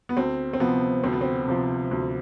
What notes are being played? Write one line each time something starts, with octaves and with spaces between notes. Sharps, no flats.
B3
D2 C4
C4
C3 F3 B3
D2 C4
B3
C4
C3 F3
D2